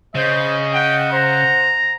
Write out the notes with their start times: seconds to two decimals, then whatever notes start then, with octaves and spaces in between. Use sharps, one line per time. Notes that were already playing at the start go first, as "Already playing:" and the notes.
0.15 C#3 C5 D#5
0.74 F#5 G5
1.12 C5 A#5